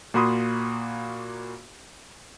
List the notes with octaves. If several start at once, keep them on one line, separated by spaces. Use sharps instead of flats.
A#2 A#3 F#4 B5 C6 D#6